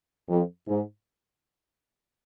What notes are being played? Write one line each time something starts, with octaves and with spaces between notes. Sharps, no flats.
F2
G#2